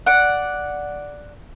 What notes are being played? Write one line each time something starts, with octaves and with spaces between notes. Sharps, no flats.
D5 F#5